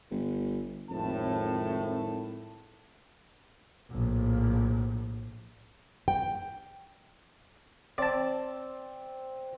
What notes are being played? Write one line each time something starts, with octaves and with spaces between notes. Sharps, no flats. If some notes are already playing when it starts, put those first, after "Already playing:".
G1
G#1 F2 A2 A5
A#1 A2
G5
C4 D5 A5